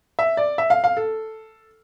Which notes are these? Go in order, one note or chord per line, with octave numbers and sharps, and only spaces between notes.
E5
D5
E5
F5
F5
A4